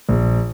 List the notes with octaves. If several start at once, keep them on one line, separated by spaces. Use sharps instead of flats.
A#1